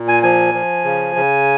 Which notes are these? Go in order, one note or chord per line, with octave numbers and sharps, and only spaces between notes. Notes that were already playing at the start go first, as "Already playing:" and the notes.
Already playing: A#2
G#5
F3 G#5
F3
C#3
C#3